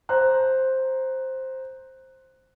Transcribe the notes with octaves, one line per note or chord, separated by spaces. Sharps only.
C5 A#5 C6 F#6